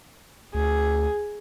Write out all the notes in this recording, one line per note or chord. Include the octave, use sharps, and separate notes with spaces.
D2 G#4